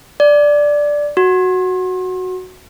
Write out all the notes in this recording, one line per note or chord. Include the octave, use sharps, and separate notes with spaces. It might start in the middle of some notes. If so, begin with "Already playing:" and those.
D5
F#4